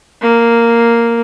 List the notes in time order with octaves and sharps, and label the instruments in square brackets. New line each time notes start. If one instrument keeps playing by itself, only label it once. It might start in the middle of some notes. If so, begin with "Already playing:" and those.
[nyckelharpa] A#3